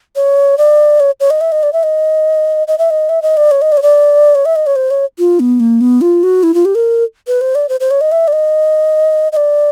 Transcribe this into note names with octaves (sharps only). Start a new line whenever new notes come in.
C#5
D5
C#5
C#5
D#5
E5
D#5
D5
E5
D#5
D#5
E5
D#5
E5
D#5
D5
C#5
D#5
D5
C#5
D5
C#5
E5
D#5
C#5
C5
C#5
F4
B3
A#3
B3
F4
F#4
E4
F4
G4
A#4
B4
C5
D5
C5
C5
C#5
D#5
E5
D5
D#5
D#5
D5